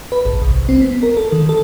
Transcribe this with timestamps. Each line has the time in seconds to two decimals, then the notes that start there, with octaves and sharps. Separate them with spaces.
0.12 B4
0.25 G#1
0.42 C2
0.69 C4
0.81 B3
1.03 A#4
1.17 A4
1.32 D#3
1.49 A4